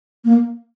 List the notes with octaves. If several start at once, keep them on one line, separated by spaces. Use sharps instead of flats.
A#3